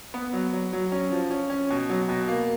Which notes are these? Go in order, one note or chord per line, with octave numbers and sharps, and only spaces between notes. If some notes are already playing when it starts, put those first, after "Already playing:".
B3
F#3
F#3
F#3
C#4
F3
C#4
C#4
B2
F#3
B2
A#3